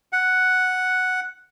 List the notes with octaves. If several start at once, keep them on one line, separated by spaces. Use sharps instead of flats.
F#5